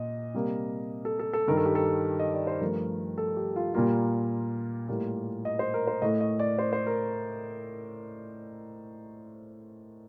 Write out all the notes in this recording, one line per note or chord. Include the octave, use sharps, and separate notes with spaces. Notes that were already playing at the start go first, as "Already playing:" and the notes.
Already playing: A#2 D#5
C3 G3 A#3
A4
A4
A4
G2 D#3 G3 A#4
A4
G4
A4
D#5
D5
C5
G2 F3 A3 A#4
A4
G4
F4
A#2 G3 A#3 F4
A2 G3 A#3
D#5
C5
A#4
C5
A2 A3 D#5
D#5
D5
C5
C5
A#4